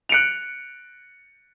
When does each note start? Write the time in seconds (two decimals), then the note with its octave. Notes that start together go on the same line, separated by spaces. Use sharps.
0.09 F#6 C#7 D7 F7